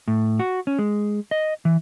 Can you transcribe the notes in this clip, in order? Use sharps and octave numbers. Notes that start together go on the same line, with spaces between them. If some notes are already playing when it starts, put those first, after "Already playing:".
A2
F#4
C#4
G#3
D#5
E3